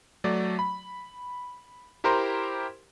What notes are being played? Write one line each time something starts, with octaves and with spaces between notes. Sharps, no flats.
F#3 A3 D5
B5
E4 G4 A#4 C5 A#5 C6